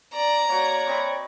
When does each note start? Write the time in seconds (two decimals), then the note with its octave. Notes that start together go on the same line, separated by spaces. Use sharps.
0.14 D5 A#5
0.49 A#3 F#4 C#5 D5
0.87 C4 D#5 B5